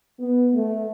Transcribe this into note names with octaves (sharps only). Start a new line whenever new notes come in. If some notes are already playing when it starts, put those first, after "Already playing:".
B3
A3